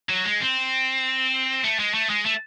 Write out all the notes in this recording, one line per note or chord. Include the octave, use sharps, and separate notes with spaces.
F#3
G#3
C4
A3
G#3
A3
G#3
A3